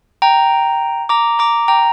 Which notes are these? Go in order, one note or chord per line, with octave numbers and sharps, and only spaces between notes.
G5 A#5
A#5 D6
A#5 D6
G5 A#5